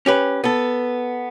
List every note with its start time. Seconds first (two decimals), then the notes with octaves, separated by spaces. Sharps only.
0.06 C#4 G4 B4
0.44 B3 A4